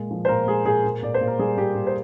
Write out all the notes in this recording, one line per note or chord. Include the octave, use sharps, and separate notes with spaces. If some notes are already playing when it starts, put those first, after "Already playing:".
Already playing: A#2 G#3
F3
C5
A#2 A#4
G#3 G#4
A#2 G#4
A#2
A#2 D5
C5
A#2
A#4
G3 G#4
A#2 G4
A#2
C5